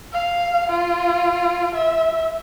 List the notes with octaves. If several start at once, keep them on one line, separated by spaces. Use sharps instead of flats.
F5
F4
E5